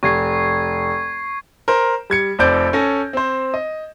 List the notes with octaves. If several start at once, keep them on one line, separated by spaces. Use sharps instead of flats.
F1 C#6 G#6 C7
A#4 C5
G3 G#6 C#7
F1 F2 C4 D5 G6 D7
C#4 A4 G#5 A#6
C4 C5
D#5